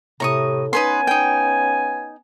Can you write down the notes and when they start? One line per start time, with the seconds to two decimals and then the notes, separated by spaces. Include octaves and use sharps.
0.20 A2 C3 A#5 C#6 D#6
0.73 B3 C#4 D#4 B4 G#5 C6
1.07 D#4 G5